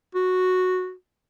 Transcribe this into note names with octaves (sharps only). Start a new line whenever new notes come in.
F#4